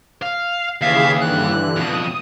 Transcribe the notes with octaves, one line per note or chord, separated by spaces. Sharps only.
F5
D#2 C#3 E3 G#4 E5 F5
G2 D3 E3 F#6
F2 B2 D#6